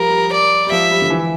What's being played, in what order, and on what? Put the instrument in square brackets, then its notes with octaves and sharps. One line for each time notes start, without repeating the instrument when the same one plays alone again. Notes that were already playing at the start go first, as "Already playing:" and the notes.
Already playing: [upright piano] F3 G3 [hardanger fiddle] A#4
[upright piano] G3
[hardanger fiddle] D5
[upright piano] G3
[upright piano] F3 [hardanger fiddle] E5
[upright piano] G3
D3
E3